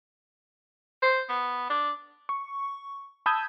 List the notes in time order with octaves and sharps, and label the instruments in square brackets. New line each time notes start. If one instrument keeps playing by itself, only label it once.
[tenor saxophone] C5
B3
D4
[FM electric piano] C#6
A5 B5 D#6 E6 G6 G#6